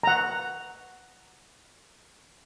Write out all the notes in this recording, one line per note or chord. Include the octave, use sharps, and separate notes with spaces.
F#5 A#5